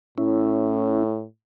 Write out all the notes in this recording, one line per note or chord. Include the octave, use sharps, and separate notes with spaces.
A2 C#4 E4